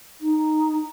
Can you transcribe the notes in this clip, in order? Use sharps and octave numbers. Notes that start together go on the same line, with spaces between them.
D#4